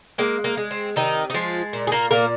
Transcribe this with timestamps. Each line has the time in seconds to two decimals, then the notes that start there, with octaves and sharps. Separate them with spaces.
0.18 G#3 A#3
0.44 A#3
0.57 G#3
0.71 C4
0.96 C3 D#3 D#4
1.30 D#4
1.34 F3 G#3 F4
1.73 A#2
1.87 G#4
1.92 A#3 A#4
2.11 A#2 A#3 A#4